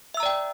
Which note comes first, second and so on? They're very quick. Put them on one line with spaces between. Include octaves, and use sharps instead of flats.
E5 E6 A#5 D5 G5